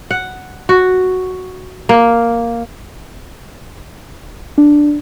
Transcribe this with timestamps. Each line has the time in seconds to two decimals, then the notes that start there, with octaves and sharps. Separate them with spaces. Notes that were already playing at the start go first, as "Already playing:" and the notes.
0.11 F#5
0.69 F#4
1.89 A#3
4.58 D4